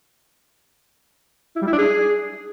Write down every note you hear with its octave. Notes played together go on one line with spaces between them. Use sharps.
E4
G3
E4
D4
G#4